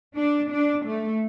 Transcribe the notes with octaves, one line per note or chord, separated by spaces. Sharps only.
D4
D4
A3